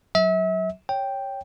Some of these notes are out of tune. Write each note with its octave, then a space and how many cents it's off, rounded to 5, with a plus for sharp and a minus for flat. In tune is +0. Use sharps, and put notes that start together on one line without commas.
F#3 +10 E5 -35
C#5 +0 G5 +0